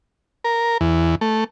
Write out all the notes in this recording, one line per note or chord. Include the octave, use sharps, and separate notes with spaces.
A#4
E2
A3